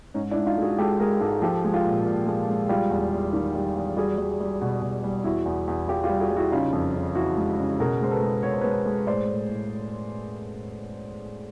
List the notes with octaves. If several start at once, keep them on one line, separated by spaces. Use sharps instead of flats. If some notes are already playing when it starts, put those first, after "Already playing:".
G#2 C#4 D#4
D4 E4
G#2
D#4 F4
G#3 F#4 G#4
G#3 G4 A4
G#3 G#4 A#4
G#2 G4 A4
F3 G4 A4
G#3
F4 G4
A#2
A#2
G#3
G#3
G3 F4 G4
E2
E2
D#3
G3
E2
G3 F#4 G#4
G3
G3
B2
B2
G3
E2 E4 F#4
E2
E2
E2 F4 G4
F4 G4
G3
F#4 G#4
G3
E4 F#4
C#3 D#4 F4
F2
C#3
E3 E4 F#4
G#3
C#3
B2 G#4 A#4
G#3 C5
A4 B4
G#3
B2 C#5
C5
G#3 B4 C#5
G#3
A2 C5 D5
A2
A2